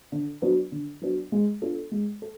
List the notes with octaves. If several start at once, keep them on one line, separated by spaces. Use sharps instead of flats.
D3
F#3 B3 D4
D3
F#3 B3 D4
G#3
B3 D4 F4 A4
G#3
A4